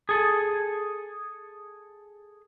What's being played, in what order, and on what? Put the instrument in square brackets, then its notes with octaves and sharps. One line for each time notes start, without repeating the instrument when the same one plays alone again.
[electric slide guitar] G#4 A4